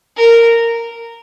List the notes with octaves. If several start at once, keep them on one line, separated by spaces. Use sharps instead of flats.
A#4